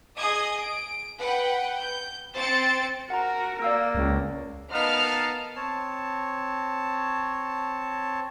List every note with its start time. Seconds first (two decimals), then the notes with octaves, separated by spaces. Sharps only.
0.19 G#4 D#5 D#6 G#6
0.61 D7
1.20 B4 F#5 G5
1.80 G6
2.35 C4 C5 A6 C#7 D7
3.10 F#4 A#4 F#5 A#5
3.62 A#3 D5 F5 E6
3.95 C#2
4.72 B3 D#4 A#4 B4 F5 A5 F6
5.56 C4 C#5 A5